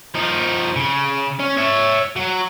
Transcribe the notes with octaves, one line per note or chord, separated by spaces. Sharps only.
F3 D#4
C#3
C#4
C#5 E5
F#3